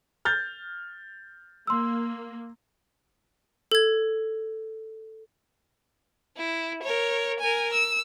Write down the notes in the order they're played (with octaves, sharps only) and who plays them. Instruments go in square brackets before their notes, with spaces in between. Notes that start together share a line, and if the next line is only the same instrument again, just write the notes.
[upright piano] F6 G6 A6
[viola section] A#3 [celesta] C6 E6
[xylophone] A4 G#6
[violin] E4
A#4 C#5
A#4 G#5
E6